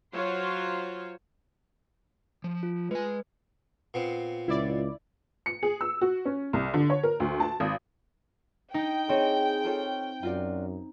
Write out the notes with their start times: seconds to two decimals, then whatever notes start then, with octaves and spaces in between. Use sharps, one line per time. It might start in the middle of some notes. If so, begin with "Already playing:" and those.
0.13 F#3 F4 C5 C#5
2.44 F3
2.63 F4
2.91 G#3 B4 G#5
3.94 A#2 B3 C4
4.48 C#2 E4 D5
5.46 C#7
5.63 G#4
5.81 E6
6.01 F#4
6.25 C#4
6.53 C2
6.74 D3
6.90 C#5
7.03 A#4
7.20 D2
7.40 A5
7.60 G#1
8.74 D#4 G5
9.09 C4 E4 G#4 C#5 D#5
9.64 F4 A4 C#5
10.23 F#2 F4 F#4 D5